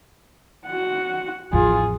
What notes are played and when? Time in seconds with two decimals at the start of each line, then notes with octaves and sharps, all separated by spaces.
0.67 F#4 F#5
1.53 A1 F2 F4 G#4